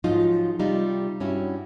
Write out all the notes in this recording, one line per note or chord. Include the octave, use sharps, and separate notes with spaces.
G#2 F3 F#3 D#4 F4
C3 G3 D#4 F4
G2 C#4 E4 F#4